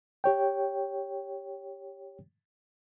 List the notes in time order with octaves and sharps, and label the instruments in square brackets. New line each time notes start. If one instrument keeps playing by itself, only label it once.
[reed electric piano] G4 C#5 G5